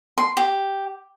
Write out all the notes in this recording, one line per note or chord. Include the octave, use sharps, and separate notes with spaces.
C6
G4